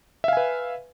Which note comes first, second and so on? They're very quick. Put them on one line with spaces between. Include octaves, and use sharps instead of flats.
E5 F5 G#5 B4